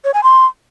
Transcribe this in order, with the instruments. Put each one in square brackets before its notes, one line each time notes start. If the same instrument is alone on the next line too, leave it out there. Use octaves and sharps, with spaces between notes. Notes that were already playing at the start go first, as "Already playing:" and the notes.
[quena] C#5
G#5
C6